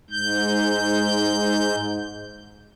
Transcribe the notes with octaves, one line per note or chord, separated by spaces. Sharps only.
G#2 G6